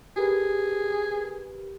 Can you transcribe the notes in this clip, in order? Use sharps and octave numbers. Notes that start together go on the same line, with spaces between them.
G4 G#4 A#4 B4